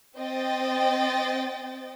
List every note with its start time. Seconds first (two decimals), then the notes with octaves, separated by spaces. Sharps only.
0.18 C4 C5 D#5 G5 A6